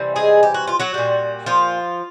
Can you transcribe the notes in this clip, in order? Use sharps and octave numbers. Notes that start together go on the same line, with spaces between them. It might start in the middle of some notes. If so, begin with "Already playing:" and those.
Already playing: C3 E3 G3
G#3 G#4
G4
F#4
F4
F#3 F#4
A#2 G3
F3 F4